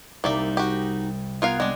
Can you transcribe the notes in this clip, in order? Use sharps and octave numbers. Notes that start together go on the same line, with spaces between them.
C2 C3 A#3 D#4 D5 E5
F#4 G4
B3 F4 A#4 F5 F#6 G#6
G3 G#3 C4 D4 D#7